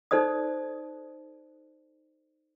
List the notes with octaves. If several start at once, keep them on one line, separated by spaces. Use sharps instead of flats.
D#4 A4 C5 D5 D#6